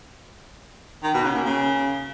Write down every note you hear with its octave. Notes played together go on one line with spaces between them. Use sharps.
D#3
B2
C#3
A#3
C#3